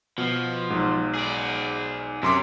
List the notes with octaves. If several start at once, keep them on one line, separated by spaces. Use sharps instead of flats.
B2 F3
B1 G#2
G#4 D5
F#2 C3 C6 D6